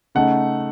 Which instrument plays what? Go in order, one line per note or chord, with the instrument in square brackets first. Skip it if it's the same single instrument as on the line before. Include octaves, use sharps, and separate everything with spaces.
[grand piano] C#3 A3 D#4 F#5